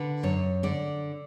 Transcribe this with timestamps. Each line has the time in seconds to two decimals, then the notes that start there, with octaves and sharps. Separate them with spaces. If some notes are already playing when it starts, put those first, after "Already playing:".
Already playing: D3 B4
0.23 F#2 C#5
0.63 D3 D5